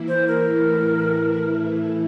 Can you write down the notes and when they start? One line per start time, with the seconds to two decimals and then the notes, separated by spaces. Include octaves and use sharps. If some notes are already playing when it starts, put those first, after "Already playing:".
Already playing: E3 A#3 E4
0.08 C5
0.27 A#4
0.47 A2 E3 A3 E4